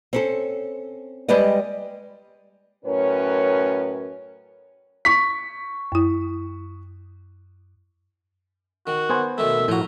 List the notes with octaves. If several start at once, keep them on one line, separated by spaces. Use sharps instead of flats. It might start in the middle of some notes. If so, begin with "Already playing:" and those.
C4 C#4 A4
G3 G#3 G4 B4 D5 D#5
F#2 A2 C#4 A#4 B4 C#5
C#6 B6
F#2 E4
D#3 F#4
B3 C5 G#5
B2 D#3 A3 E5
A2 F3 F#4 A#5